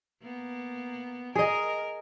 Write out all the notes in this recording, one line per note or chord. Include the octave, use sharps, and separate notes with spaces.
A#3 B3
G#4 A#4 D#5